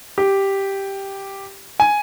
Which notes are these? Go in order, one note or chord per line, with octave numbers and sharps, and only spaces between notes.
G4
G#5